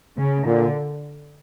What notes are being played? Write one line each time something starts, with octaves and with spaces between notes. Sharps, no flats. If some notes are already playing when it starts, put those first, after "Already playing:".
C#3
A#2 D3